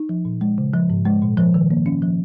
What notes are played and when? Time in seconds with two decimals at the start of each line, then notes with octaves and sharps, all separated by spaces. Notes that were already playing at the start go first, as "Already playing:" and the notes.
Already playing: D#4
0.09 F3
0.25 A#2
0.41 G#3
0.58 C#3
0.74 F3
0.90 G#2
1.05 G#3
1.22 A#2
1.38 F3
1.54 D#3
1.70 A#3
1.86 C#4
2.02 F3